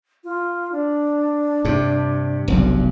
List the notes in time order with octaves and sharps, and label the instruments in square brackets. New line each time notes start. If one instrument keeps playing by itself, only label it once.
[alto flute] F4
D4
[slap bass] G2 C3
F1 B1 G2